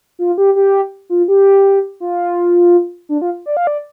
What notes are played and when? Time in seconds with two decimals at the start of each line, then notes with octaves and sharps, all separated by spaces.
0.19 F4
0.38 G4
0.56 G4
1.10 F4
1.28 G4
2.00 F4
3.09 D4
3.22 F4
3.46 D5
3.57 F5
3.67 D5